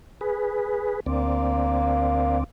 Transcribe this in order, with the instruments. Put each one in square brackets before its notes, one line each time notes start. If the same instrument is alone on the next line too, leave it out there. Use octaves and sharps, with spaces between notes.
[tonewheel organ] G#4 B4
[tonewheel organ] D2 C4 D5 [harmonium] A#3